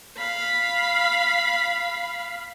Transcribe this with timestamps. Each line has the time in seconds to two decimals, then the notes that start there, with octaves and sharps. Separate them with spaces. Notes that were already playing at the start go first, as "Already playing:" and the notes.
0.18 F5 B5